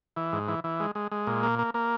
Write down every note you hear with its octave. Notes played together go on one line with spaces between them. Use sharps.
E3
G#2
E3
E3
G#3
G#3
G#3
A#2
A#3
A#3
A#3